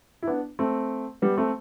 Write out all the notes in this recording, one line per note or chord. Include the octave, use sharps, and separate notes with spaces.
E4
B3 D4
A3 C4
G3 B3
A3 C4